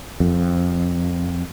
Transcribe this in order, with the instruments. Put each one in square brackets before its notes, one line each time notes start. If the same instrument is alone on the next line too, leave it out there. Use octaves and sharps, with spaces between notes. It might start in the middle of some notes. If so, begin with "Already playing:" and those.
[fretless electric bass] F2